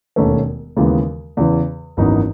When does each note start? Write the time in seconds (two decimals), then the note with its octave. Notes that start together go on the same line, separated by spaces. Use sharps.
0.16 E1 D#2 D#3 A3 C#4
0.76 D#2 C#3 E3 G#3 B3
1.37 E2 C#3 E3
1.97 G#1 F#2 E3 B3 D#4